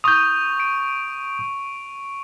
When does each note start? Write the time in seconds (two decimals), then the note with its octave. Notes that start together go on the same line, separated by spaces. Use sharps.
0.04 C#6 D#6 G6 F7
0.60 D7